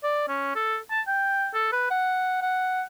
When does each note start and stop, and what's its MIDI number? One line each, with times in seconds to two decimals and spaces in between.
0.03 0.24 74
0.28 0.52 61
0.55 0.77 69
0.91 1.01 81
1.07 1.49 79
1.54 1.68 69
1.72 1.86 71
1.91 2.38 78
2.42 2.83 78